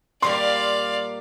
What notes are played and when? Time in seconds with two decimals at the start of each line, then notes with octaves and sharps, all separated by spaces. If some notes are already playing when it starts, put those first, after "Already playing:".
0.22 A#2 G3 A#3 D5 F5 C6